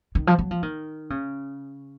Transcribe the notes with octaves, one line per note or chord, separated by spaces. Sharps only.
D#3
F3
F#3
F3
D#3
C#3